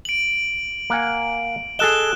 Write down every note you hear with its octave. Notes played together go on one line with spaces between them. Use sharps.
D7 F#7
A#3 F#5 G#5
G#4 A4 D#5 F#6 E7 G7